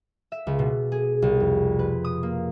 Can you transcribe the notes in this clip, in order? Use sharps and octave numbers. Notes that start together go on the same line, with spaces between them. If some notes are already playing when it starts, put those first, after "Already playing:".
E5
C#2
B2
G#4
C2
F2
B4
D#6
A#3